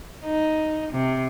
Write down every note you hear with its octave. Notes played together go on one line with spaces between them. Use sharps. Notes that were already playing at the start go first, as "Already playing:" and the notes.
D#4
C3